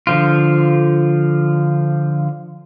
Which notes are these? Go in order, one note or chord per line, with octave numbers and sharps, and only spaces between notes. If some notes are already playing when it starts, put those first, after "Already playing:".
D3 F3 F4